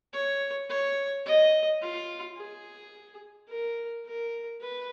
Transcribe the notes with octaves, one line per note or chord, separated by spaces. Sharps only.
C#5
C#5
D#5
F4
G#4
A#4
A#4
B4